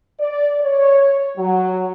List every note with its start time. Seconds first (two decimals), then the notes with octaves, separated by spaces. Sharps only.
0.20 D5
0.61 C#5
1.37 F#3